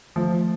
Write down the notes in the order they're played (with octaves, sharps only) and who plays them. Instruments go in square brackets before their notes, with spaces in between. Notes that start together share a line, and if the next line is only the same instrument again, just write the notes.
[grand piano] F3 [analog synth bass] A3